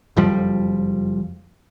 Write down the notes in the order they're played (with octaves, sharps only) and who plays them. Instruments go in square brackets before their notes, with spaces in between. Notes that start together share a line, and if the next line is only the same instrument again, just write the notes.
[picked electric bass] F#1 F2 F3 G3